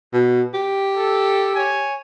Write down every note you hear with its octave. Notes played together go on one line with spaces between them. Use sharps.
B2
G4
A4
C#5 G#5